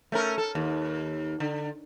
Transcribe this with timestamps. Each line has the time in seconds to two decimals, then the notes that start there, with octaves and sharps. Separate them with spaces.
0.12 A3 C#4 A#4
0.38 A4
0.55 D#2
1.40 D3